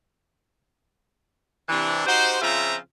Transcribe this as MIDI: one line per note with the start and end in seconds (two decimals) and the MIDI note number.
1.69 2.04 48
1.69 2.04 52
1.69 2.04 62
2.06 2.40 63
2.06 2.40 66
2.06 2.40 67
2.06 2.40 72
2.41 2.76 49
2.41 2.76 53
2.41 2.76 60
2.41 2.76 65
2.41 2.76 76
2.41 2.76 82